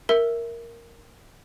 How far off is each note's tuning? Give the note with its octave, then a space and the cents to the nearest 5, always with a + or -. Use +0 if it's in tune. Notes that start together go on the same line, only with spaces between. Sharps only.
A#4 +0 E5 +0 E6 +0